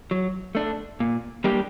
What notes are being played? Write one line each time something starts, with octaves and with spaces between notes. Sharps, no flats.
F#3
A3 D4
A#2
G3 A#3 D4 G4